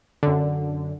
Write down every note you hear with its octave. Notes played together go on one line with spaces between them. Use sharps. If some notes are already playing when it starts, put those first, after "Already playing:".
F#2 D3